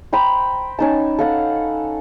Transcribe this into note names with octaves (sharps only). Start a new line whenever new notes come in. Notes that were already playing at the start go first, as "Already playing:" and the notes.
C5 G5 A#5 B5
C#4 D#4 A5
A4 F5 F#5